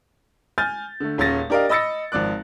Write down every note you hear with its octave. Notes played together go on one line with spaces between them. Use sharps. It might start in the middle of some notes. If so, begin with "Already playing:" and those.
G#5 F6 G6 A6
D3 A3
D#1 C#4 G#4 A6 A#6
D4 G4 A#4 D5 D#5 F5
D#5 B5 E6 A6 A#6 C#7
G#1 F3 D5 D6 F#6